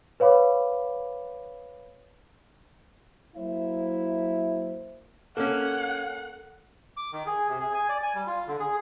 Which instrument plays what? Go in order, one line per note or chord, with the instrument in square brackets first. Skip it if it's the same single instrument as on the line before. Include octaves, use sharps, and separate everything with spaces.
[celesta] B4 C#5 F5 B5 D6
[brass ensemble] F#3 A#3 E4 C5 E5
[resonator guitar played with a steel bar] A#3 C#4 [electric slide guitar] A4 A#4 [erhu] F#5
[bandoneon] D6
D#3
G#4
C3
G#4
G#5
D5
G#5
G3
F4
D3
G#4